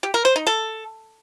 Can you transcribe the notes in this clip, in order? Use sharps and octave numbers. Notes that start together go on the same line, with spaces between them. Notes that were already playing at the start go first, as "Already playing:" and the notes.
G4
A#4
C5
D#4
A4